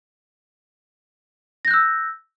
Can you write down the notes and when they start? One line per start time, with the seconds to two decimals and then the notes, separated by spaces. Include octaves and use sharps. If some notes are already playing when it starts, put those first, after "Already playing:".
1.65 A#6
1.68 G6
1.71 F#6
1.74 E6